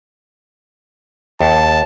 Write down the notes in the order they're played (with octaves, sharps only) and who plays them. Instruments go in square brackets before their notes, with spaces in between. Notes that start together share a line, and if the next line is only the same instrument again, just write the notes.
[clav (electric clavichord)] D#2 [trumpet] A5